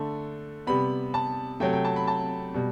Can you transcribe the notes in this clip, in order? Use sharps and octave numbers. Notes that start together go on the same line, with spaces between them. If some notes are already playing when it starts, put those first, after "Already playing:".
Already playing: D3 A3
C3 G3 B3 B5
A5
C3 F#3 A3 G5
G5
A5
B5
A5
B2 G3